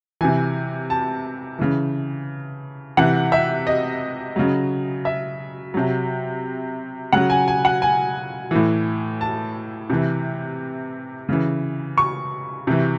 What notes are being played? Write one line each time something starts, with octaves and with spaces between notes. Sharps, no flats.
C3 E3 G#5
A5
C#3 E3
C3 E3 F#5
E5
D#5
C#3 F#3
E5
C3 F#3
C#3 F#3 F#5
G#5
G#5
F#5
G#5
A2 E3
A5
C3 E3
C#3 E3
C#6
C3 E3